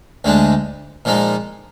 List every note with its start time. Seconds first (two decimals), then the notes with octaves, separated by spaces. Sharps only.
0.24 D2 D3 G#3 D4
1.05 A#2 F3 G#3 D#4